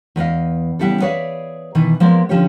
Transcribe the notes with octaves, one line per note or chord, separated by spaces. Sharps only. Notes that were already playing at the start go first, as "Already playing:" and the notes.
E2 B4 D#5 F5
C#3 G3 B3 E4 G4 A4
G#4 B4 C#5 D5 E5 F5
B2 D#3 E3
F3 G#3 A#3 B3 D5
D3 F3 C#4 G4 C#5